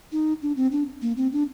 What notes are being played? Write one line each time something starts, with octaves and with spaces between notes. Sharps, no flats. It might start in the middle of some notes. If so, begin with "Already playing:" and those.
D#4
D4
C4
D4
A#3
C4
D4